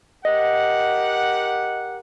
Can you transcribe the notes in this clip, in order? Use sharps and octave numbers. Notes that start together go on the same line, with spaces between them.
G4 A#4 D#5 F#5